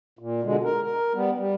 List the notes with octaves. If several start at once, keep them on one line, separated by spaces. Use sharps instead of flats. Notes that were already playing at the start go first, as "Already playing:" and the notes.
A#2
B2 D3 G#3
A#4
A#4
G3 B3
G3